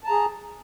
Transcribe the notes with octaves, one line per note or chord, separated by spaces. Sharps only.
G#4 A5 A#5